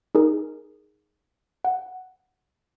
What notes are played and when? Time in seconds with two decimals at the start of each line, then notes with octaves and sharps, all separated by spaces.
0.15 D#4 G#4 A#4
1.65 F#5